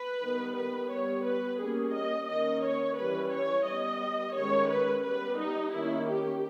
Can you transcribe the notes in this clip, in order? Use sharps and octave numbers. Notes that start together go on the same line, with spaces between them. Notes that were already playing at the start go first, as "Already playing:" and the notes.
Already playing: B4
D#3 G3 B3
B4
G3 B3 C#5
B4
G3 A#3 C#4 G#4
D#5
D#3 A#3 C#4 D#5
C#5
E3 G3 C#4 B4
C#5
G3 B3 D#5
D#3 G#3 C#4 C#5
B4
G3 B3 B4
D#4
D#3 A#3 C#4 E4
G4